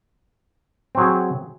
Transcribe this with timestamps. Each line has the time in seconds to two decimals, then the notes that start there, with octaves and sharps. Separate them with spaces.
0.95 C4
0.97 F#3
1.00 G#4